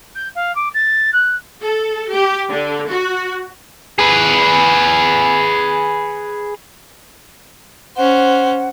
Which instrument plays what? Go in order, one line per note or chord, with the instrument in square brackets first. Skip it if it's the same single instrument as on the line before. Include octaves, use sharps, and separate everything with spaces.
[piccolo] G6
F5
D6
A6
F#6
[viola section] A4
G4
D3
F#4
[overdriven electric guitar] G#4 B4
[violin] C#4 C5 [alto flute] F#5